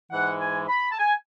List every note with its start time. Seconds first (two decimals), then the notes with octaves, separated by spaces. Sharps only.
0.12 G#2 E3 G#3 F#5
0.40 G#5
0.69 B5
0.91 A5
0.98 G#5